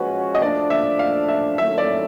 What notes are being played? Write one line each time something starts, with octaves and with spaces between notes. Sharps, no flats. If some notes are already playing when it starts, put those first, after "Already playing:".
Already playing: F3 G#3 C#4 F#4 B4
D#5
F3 A3 D4 D5
E5
F5
E5
D#3 F#3 A3 C#4 E4 E5
D5